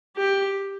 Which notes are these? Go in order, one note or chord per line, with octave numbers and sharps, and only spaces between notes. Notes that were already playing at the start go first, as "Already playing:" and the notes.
G4